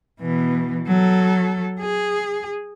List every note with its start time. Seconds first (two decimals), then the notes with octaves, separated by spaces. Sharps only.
0.21 B2 E3
0.87 F#3 A4
1.80 G#4